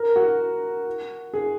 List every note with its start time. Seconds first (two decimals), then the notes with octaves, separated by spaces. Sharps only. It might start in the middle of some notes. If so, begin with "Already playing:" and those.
Already playing: A#4
0.16 F#4
1.34 G#4